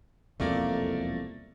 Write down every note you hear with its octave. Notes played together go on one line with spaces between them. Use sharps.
E1 C2 F2 A3 A#3 D5